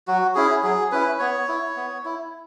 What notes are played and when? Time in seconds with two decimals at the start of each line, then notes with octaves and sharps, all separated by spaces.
0.07 F#3 F#4
0.35 C#4 E4 G#4
0.64 F#3 G#4
0.92 C#4 E4 B4
1.19 B3 C#5
1.49 E4
1.76 B3
2.05 E4